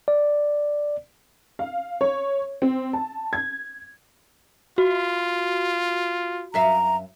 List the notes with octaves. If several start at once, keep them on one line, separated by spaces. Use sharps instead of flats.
D5
F5
C#5
C4
A5
G#6
F4 F#4
F#2 E5 F5 A#5